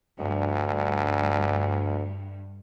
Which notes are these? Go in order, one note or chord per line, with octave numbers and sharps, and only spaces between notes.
D2 G2